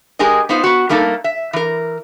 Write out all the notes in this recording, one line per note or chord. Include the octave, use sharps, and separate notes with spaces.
G#3 G4 G#4 A#4 D#5
B3 D#4 F4 C5
B3 F#4
G3 A3 A#3 D#4 A4
E5
E3 A#4